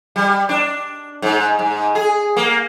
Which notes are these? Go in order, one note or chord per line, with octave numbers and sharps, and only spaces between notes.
G3
D4
G#2
G#2
G#4
A#3